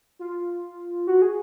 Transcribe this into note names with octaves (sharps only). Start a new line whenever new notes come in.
F4
F#4
G#4